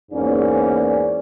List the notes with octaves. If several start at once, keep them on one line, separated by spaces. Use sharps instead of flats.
E2 G#2 A#3 C#4 D5